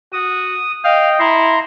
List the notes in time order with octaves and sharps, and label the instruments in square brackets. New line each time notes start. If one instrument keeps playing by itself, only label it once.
[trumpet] F#4 [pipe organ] D#6
[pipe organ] D#5 G5 [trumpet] F5
[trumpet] E4 [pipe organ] A#5 C6